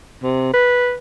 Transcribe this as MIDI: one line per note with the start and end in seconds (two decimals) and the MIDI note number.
0.23 0.52 48
0.53 0.96 71